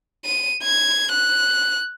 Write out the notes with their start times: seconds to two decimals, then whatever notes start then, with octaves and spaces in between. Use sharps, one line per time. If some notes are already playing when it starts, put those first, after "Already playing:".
0.25 D#7
0.63 G#6
1.12 F#6